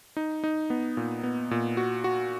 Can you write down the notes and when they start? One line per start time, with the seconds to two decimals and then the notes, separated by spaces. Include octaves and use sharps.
0.17 D#4
0.44 D#4
0.70 B3
0.97 A#2
1.23 B3
1.51 A#2
1.77 F#4
2.04 F#4